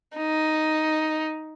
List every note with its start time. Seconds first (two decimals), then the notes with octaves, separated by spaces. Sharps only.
0.17 D#4